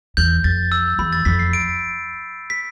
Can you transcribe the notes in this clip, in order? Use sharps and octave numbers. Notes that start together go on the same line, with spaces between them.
E2 G6
F2 A6
E6
E2 B5
A6
F2 B6
C7
D7
B6